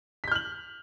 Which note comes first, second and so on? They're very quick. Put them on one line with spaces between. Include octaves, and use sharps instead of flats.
B6 G6 F6 F#7